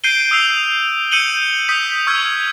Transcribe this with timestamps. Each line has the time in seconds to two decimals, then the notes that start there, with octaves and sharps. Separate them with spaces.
0.04 G6 C7 D7 D#7 G7
0.31 D#6 E6 C7 F7
1.11 E6 G6 C#7 D#7 F#7 G7
1.69 D#6 G6 B6
2.07 C#6 E6 F6 G#6